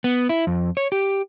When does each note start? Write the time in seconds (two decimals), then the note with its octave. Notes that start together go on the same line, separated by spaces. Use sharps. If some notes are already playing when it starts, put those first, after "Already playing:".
0.04 B3
0.29 E4
0.47 F2
0.77 C#5
0.92 G4